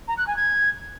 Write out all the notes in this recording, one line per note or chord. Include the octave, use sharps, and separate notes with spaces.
A#5
F#6
G#5
G#6